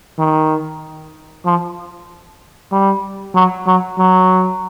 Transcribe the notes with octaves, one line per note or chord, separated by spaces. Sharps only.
D#3
F3
G3
F#3
F#3
F#3